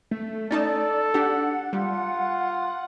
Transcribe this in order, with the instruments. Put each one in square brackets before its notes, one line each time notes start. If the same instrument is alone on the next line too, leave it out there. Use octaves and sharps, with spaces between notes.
[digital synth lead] A3
[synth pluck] C#4 D#4 A5 [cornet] A4 [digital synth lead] D5
[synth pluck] D4 G4 [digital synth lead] F#5
[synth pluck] G3 [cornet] F4